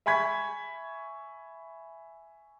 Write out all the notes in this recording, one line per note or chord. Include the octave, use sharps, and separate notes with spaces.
E5 G#5 B5 C#6 G#6 B6